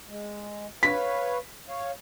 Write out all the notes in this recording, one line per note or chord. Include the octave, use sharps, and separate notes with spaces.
G#3
B4 C#5 F5 B6
C#5 F5